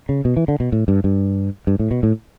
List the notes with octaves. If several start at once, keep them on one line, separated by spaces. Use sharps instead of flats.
C#3
B2
E3
D3
B2
A2
G2
G2
G2
A2
B2
A2